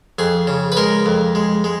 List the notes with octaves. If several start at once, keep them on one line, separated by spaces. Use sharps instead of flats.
F2 G#4
C#3
B4
G#3 A#4
F2
G#3
G#3